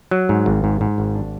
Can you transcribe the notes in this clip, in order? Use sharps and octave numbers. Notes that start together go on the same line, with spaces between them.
F#3
G#2
G#1
G#2
G#2
G#1
D4